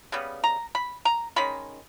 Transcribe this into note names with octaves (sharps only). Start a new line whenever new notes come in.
C#3 G3 B3
A#5
B5
A#5
D#3 G#3 C#4 B5